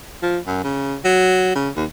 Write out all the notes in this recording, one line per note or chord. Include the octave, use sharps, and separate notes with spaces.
F3
F#2
C#3
F#3
C#3
D#2